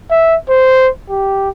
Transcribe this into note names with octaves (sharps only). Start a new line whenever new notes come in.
E5
C5
G4